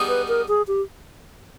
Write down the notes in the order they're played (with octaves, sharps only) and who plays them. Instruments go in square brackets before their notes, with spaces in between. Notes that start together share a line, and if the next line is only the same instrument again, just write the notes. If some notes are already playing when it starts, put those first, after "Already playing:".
Already playing: [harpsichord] G3 B3 D#4 G#4
[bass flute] B4
A#4
G#4
G4